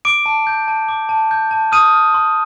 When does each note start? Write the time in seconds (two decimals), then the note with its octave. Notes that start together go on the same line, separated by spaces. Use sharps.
0.05 D6 D7
0.26 A5
0.47 G6
0.68 A5
0.89 D6
1.09 A5
1.31 G6
1.51 A5
1.72 D#6 F6 D#7
1.94 F6
2.14 C6